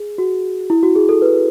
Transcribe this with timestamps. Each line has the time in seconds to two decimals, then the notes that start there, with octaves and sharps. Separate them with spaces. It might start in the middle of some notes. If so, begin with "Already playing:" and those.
Already playing: G#4
0.18 F#4
0.70 E4
0.83 F#4
0.95 G#4
1.09 A4
1.22 B4